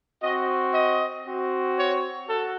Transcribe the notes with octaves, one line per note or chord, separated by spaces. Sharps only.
C4 F#4 D#5
D#5
C4 F#4
C#5
F#4 A4